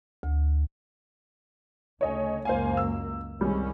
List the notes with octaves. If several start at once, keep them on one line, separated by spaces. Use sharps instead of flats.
D2
D2 C#3 A3 C#5 D#5 G#5
C#2 F#2 A#3 C5 F5 G#5
E6
C2 D#3 G3 G#3 C#4